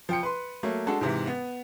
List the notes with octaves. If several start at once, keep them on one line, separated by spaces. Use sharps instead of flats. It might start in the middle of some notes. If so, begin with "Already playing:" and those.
F3 G5 C#7
B4 C6
F#3 A3 A#3
G#3 D4 F#4 A4
G#2 C3 E3
B3